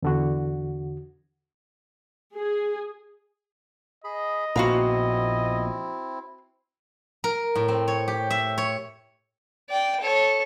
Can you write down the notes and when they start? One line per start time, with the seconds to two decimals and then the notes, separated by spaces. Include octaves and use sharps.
0.02 E2 D3 F#4
2.36 G#4
4.04 G#4 D#5 B5
4.56 A#1 A#2 B3 C4 E4 F#4 F5 A#5
7.24 A#4
7.55 A2
7.68 C4
7.88 C#5
8.08 G4
8.30 E5
8.58 C#5
9.70 D5 G5
10.00 A4 C#5